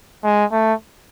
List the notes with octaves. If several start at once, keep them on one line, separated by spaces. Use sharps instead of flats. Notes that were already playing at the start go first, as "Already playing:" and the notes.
G#3
A3